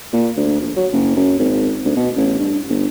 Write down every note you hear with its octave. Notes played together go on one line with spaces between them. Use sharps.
A#2
D2
A#1
F#3
F#1
F#2
G#1
D2
B2
A1
G2
G1